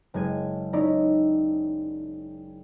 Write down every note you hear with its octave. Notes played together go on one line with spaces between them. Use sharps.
F#1 G#3 G#6 D#7
C#4 D#4 E4 D5 A#5